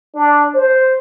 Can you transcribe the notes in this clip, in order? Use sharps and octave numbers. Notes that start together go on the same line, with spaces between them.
D4
C5